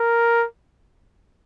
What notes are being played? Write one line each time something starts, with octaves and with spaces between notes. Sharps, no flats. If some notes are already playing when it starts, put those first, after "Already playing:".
Already playing: A#4